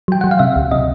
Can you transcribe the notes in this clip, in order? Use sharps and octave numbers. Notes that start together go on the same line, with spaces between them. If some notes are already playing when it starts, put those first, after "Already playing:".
F#3 G5
F#3 F#5
F5
C3 E5
C#2
C3 D#5